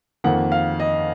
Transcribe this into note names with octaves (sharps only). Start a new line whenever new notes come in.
F2 D#3 A#3 F#5
F5
D#5